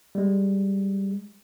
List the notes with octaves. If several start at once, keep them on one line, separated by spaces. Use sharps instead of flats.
G3 G#3